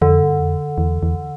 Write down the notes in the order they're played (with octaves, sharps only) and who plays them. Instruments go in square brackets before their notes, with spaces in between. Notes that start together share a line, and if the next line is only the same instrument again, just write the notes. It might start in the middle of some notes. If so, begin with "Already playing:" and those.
[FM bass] F2 [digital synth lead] D3
[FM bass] G2
F2
E2
E2